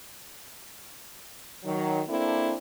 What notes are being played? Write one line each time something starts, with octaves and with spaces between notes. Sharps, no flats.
D#3 F#3
A#3 C4 D4 E4 A4